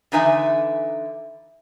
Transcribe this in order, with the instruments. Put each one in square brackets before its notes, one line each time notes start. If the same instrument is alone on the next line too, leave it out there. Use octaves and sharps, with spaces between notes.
[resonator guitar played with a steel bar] D3 E3 D#4 B4 E5 G#5